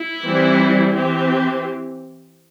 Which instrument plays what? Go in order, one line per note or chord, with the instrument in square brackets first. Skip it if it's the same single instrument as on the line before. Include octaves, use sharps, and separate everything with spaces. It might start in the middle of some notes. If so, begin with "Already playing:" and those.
Already playing: [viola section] E4
E3 G3 C4
E3 C4 G4